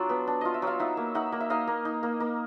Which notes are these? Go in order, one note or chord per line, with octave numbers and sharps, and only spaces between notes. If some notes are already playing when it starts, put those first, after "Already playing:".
Already playing: F#3 D4 F4 F#5
B3
D4
F4 D#5
E5
F#3 F5
D#4 E5 F#5
A#3
D#4 E5 F#5
A#3
E5
D#4 D#5 F5
A#3
D#4
A#3
A#3